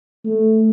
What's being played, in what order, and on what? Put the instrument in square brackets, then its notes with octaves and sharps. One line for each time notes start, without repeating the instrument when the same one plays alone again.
[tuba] A3